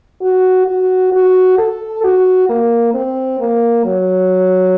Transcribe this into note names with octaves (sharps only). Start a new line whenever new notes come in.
F#4
F#4
F#4
A4
F#4
A#3
C4
A#3
F#3